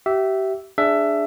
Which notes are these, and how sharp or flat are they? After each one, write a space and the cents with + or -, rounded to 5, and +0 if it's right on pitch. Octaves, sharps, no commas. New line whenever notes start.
G4 -30 E5 +0
D4 +0 G#4 +0 E5 +15